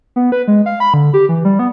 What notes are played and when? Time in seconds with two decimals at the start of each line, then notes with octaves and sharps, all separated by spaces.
0.16 B3
0.32 B4
0.48 G#3
0.66 F5
0.80 B5
0.94 D3
1.14 G4
1.29 E3
1.45 G3
1.59 B3